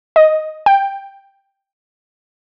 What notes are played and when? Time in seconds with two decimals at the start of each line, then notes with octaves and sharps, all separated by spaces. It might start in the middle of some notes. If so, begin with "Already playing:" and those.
0.16 D#5
0.66 G5